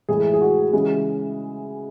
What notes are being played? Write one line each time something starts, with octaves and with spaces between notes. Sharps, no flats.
A2 E3 G#3 G#4
G#4
F#4
C#3 E3 G#3